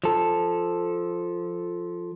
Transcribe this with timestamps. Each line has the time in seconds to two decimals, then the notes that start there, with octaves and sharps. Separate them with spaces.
0.04 F3 A4